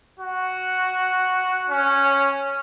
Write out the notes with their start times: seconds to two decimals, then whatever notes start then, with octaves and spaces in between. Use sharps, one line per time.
0.20 F#4
1.70 C#4